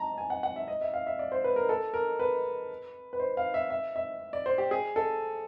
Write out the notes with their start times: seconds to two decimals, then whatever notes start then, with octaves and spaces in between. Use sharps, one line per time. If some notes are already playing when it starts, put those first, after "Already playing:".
Already playing: A5 A#5
0.18 G#5
0.30 F#5
0.43 F#5
0.56 E5
0.68 D#5
0.81 E5
0.94 F5
1.07 E5
1.19 D5
1.32 C5
1.44 B4
1.56 A#4
1.69 A4
1.94 A#4
2.19 B4
3.13 B4
3.20 C5
3.37 F5
3.54 E5
3.70 E5
3.96 E5
4.33 D5
4.46 C5
4.58 G4
4.71 G#4
4.96 A4